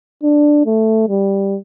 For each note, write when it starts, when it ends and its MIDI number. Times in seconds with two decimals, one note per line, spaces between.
0.23 0.63 62
0.67 1.09 57
1.09 1.57 55